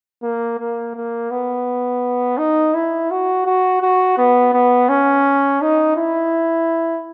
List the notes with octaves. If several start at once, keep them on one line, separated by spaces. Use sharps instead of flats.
A#3
A#3
A#3
B3
D#4
E4
F#4
F#4
F#4
B3
B3
C#4
D#4
E4